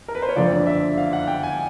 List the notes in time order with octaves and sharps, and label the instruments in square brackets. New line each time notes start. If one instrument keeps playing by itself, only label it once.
[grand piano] A#4
B4
C5
C#5
[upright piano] F#1 F2 D3 F3 [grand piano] D5
[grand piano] E5
F5
F#5
G5
G#5